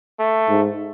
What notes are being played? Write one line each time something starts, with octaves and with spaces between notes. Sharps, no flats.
A3
G#2